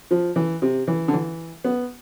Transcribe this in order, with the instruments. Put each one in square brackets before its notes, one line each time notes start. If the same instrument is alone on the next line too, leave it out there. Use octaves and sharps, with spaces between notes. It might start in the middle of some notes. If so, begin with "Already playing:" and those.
[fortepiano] F3
E3
C3
E3
D3
E3
B3